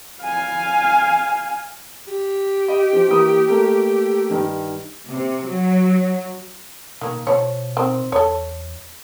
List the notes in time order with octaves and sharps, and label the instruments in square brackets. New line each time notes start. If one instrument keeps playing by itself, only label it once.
[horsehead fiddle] F5 G#5
[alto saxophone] G4
[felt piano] D#5
F3
E3 A#3 D#6
A3 A#3 A4
G2 D#3
[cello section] C3
F#3
[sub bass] B2 [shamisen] D#3 A#3
[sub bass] B2 [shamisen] F3 C#5
[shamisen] D#3 C4
[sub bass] E2 [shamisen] A4 C#5